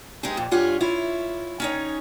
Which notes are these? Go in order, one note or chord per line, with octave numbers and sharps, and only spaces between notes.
G#3 C4 D#4 G4 G#4
F2 A#2
G2 G3 F4 C#5 F#5 G#5
E4 F4 C#5
C#4 D#4 C#5